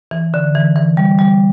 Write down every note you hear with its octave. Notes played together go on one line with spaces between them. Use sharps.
E3
D3
E3
E3
G3
G3